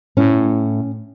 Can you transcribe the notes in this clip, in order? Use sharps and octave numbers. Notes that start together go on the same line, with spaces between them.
A2 C#4